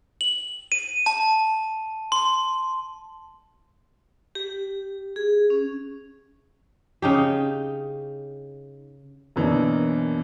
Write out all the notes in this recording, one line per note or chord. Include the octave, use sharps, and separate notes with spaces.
F#7
D#7
A5
C6
G4
G#4
C#4
C#3 D#4 G4
F#2 B2 E3 A#3 D4